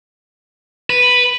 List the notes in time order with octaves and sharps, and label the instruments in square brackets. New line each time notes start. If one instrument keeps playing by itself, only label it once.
[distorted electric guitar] B4